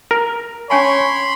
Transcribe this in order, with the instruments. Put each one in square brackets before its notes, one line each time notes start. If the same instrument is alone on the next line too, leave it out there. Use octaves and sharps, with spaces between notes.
[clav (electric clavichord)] A#4
[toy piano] C#4 G#5 A5 [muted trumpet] C#5 [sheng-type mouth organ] B5 C6